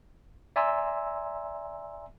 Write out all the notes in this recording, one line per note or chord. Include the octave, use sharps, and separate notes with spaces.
D5 E5 G#5 A#5 C6 E6